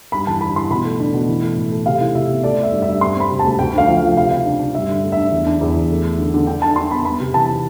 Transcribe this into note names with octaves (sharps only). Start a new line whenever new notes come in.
G2 B5
E3 A5
G2 B5
E3 C6
B2 B5
A3
D4
B2
E3
A3
A2
A3
C3 F5
E4
C3 E5
B3
A3 D5
A3
E5
G2
G2 E5
C4 C6
C4 B5
C3
A5
D2
D2 G5
D3 F5
F3
F5
F3
C3 F5
C3 F5
D4
D4
G2 E5
D3
A3
D4 E5
E2
D4
E2
E2
A3
A3
D3
D3
D4 G5
D4 A5
D4 C6
B3 B5
B3 B5
C3
E3 A5